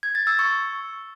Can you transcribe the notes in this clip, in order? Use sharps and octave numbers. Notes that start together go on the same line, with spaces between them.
G#6
A6
E6
C#6